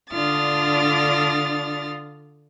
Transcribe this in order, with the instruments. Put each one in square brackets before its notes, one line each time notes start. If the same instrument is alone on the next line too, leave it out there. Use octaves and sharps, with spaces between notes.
[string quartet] D3 D4 F4 D#6 F6 A6